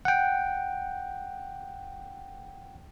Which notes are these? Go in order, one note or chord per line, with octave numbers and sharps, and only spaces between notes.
F#5 G5